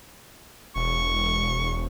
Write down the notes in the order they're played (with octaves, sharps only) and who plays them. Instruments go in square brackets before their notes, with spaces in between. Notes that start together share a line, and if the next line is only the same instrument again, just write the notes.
[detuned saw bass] E1 [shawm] C#6